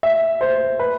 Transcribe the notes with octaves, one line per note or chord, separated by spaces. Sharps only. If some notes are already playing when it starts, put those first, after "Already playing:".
E5
C5
B4